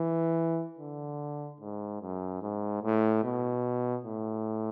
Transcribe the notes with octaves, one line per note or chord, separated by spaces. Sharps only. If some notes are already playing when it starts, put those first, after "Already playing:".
Already playing: E3
D3
G#2
F#2
G#2
A2
B2
A2